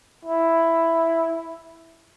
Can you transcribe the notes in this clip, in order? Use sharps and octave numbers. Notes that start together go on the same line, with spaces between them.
E4